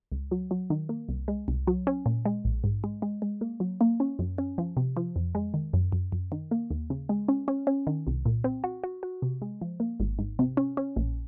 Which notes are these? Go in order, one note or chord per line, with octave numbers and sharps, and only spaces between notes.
C#2
F#3
F#3
D#3
A#3
C2
G#3
C2
F#3
C#4
A#2
G#3
A#1
G#2
G#3
G#3
G#3
A#3
F#3
A#3
C#4
F#2
C#4
F3
C3
F3
F2
G#3
D#3
F#2
F#2
F#2
D#3
A#3
D#2
C#3
G#3
C#4
C#4
C#4
D#3
C2
A#2
C4
F#4
F#4
F#4
C3
G#3
F3
A#3
G#1
G#2
C3
C#4
C#4
A#1